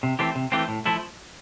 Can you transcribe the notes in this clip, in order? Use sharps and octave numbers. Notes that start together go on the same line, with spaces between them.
C3
E3 A3 C4 G4
C3
E3 A3 C4 G4
A2
F3 A3 E4